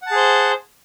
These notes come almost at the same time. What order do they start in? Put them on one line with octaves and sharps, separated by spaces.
F#5 A5 G#4 C5